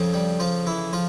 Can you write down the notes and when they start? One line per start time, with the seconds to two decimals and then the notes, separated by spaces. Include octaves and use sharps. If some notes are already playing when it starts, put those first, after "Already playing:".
Already playing: F2 C#3 F3
0.13 G3
0.40 F3 F4
0.66 E3 E4
0.93 F3 F4